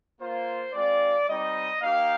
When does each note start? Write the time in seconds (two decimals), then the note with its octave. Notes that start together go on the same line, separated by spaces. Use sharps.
0.20 A#3 F4 C5
0.74 G#3 C4 F4 D5
1.27 G3 C4 D#4 D#5
1.81 A#3 D#4 G4 F5